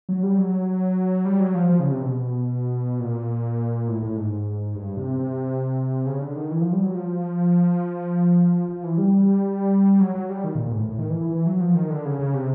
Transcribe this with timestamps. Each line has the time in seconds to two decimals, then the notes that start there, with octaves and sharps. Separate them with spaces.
0.09 F#3
0.23 G3
0.38 F#3
1.25 G3
1.40 F#3
1.54 F3
1.69 F3
1.80 C#3
1.91 C3
2.02 B2
3.00 A#2
3.88 A2
4.02 A2
4.17 G#2
4.75 G2
4.97 C3
5.19 C3
6.06 C#3
6.21 D3
6.36 D#3
6.51 E3
6.61 F3
6.73 G3
6.83 F#3
6.94 F3
8.69 F3
8.83 E3
8.98 G3
10.00 F#3
10.15 F#3
10.30 G3
10.44 D#3
10.55 A#2
10.67 A#2
10.72 G#2
10.77 A2
10.88 A2
10.99 D#3
11.10 E3
11.21 E3
11.31 E3
11.46 F#3
11.61 F3
11.75 D#3
11.90 D3
12.05 C#3
12.19 C#3
12.34 C3